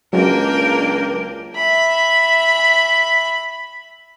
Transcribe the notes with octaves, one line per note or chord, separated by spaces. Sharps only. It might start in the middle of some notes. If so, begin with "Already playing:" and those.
C#2 F#3 G#3 A#3 C#4 D4 A#4 G5
E5 B5